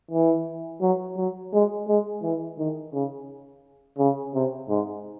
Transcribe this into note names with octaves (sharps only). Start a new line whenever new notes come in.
E3
F#3
F#3
G#3
G#3
E3
D#3
C#3
C#3
C3
G#2